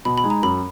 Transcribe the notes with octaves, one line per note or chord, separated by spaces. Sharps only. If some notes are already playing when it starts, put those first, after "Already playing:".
B2 B5
B5
G#3 D#4
A#5
F#2 B5